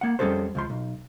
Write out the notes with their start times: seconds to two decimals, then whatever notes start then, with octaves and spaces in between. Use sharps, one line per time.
0.01 A#3 F#5
0.19 F2 G3 C#4 G#4 A4 C5
0.55 C#2 F3 C6
0.70 B1